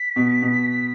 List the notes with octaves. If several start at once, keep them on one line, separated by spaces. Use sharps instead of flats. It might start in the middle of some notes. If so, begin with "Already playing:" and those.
Already playing: B6
B2
B2